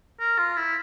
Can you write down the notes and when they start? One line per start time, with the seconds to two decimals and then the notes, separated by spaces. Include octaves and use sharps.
0.20 A#4
0.38 F4
0.57 E4